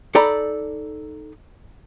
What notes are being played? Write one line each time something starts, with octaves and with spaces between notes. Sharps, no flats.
D#4 A4 D5 A#5 B5